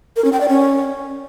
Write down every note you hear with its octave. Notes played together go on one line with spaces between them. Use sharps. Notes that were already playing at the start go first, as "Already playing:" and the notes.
A#4
C#4
G5
D5
C#4